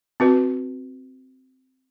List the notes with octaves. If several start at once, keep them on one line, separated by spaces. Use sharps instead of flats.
C4 F#4 B4